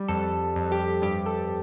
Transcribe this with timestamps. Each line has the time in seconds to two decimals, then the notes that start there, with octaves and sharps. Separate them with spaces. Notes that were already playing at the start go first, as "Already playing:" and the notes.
Already playing: G3
0.08 F2 A4
0.56 F2
0.72 G4
1.02 G2 G4
1.26 A4